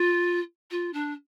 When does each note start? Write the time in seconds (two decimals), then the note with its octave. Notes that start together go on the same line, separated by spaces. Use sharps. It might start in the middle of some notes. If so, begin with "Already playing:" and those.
Already playing: F4
0.70 F4
0.93 D4